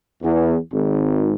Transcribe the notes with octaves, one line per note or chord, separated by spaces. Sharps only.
E2
G#1